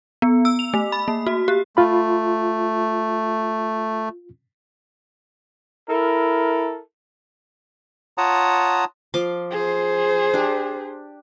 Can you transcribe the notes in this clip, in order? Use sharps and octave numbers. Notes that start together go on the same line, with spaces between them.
B3
E6
F7
A3
B5
A#3
F#4
G4
A3 F4 B5
E4 A4 A#4
F4 C#5 F#5 A5 A#5 D#6
F3 C6 D6
G#4 C5
D4 G4